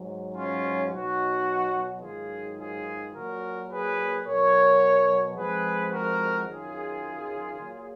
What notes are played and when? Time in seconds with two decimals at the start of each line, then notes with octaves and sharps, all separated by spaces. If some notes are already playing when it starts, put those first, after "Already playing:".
Already playing: G#2 F#3
0.35 C#4 F4
0.91 B2 F#3 D#4 F#4
2.02 G#2 D#3 F#3 F4 G#4
2.58 F4 G#4
3.13 A#2 F#3 F#4 A#4
3.69 G#4 B4
4.25 B2 F#3 A#4 C#5
5.36 F2 F3 G#3 G#4 B4
5.92 F#4 A#4
6.48 F#2 D#3 F#3 F4 G#4
7.59 A#2 F#3